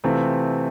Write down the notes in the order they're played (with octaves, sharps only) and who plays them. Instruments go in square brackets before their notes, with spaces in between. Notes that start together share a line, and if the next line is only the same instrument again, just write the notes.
[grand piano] C3 E3 A3 C4 F4